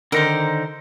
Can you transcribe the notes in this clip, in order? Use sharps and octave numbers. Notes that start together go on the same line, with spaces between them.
D3 D#3 D#4 A#4 C5